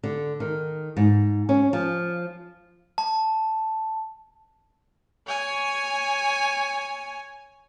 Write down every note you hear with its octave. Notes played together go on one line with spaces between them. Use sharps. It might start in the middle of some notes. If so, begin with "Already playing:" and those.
D3
D#3
G#2
C#4
F3
A5
C#5 G#5